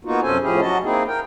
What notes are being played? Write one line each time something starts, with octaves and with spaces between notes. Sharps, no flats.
A#3 B3 D#4 F4 F#4
F#2 C3 C#4 A4 C5 G#5
A2 F3 C#4 E4 G4 G#4
F#3 F#4 D#5 A5
A#3 C4 D#4 E4 G#4
A#4 G5